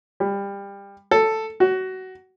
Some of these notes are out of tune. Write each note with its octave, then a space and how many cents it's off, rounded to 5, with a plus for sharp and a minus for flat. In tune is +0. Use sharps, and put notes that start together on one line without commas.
G3 +25
A4 +5
F#4 +20